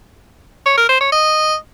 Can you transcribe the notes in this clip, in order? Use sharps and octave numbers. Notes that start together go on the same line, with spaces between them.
C#5
A#4
C5
C#5
D#5